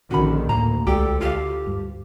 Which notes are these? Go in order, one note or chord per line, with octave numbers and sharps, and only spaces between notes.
A#1 D3 D#3 C#4 F#4 B5
D2 A2 A#3 A#5
C2 G#3 G4 A4 D5 G5
F4 G4 A4 F5
G2